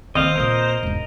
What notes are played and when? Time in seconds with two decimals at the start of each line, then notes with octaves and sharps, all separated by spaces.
0.15 D#3 A#3 C4 C5 D#5 F5
0.36 A#2 A#3 A#4 D#5
0.83 E1 G#2